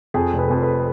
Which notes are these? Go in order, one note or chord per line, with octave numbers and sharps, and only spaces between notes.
F2 G#4
F1
B4
F2
B4